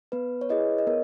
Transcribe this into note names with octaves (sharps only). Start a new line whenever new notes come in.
B3 B4
C#5
E4 G#4 B4 D#5
D#5
B3 A#4 C#5